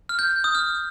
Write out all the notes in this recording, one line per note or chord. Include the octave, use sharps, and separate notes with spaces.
F6
G6
D#6
F6